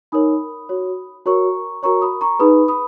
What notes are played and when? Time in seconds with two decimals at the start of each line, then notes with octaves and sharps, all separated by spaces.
0.12 D#4 A#4 C#5 B5 D#6
0.69 F#4 C#5
1.26 F#4 A#4 C#5 A#5 C#6
1.83 F#4 A#4 C#5 A#5 C#6
2.02 B5 D#6
2.21 A#5 C#6
2.39 D#4 G#4 B4 B5 D#6
2.68 B5 D#6